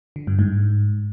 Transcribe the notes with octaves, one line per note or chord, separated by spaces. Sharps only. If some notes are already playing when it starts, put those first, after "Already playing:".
D3
G2
G#2